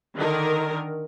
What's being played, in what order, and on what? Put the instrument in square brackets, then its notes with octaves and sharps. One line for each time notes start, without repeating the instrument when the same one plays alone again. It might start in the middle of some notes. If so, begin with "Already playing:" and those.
[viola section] D3 D#3 A#4